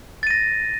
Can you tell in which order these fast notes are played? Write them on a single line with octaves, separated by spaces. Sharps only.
A6 D#7 A#6